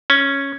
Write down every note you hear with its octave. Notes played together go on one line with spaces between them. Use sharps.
C#4